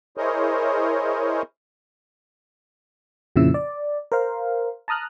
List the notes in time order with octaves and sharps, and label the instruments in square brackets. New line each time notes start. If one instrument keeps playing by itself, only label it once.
[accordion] E4 G#4 A#4 C5 C#5 D#5
[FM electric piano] F2 A#2 C#3 F3 E4 E6
D5
A#4 C5 F5
A5 A#5 D#6 F6 F#6